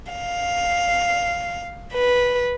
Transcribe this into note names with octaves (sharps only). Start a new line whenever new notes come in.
F5
B4